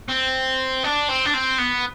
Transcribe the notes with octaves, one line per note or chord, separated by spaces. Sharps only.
C4
D4
C4
D4
C4
B3